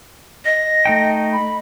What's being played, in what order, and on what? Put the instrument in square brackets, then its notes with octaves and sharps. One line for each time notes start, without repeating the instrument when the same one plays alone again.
[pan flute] D#5 [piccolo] A#6
[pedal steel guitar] A3 D#4 G5
[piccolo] B5